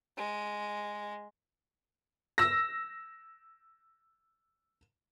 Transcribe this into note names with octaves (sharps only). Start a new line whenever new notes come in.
G#3
E6 A#6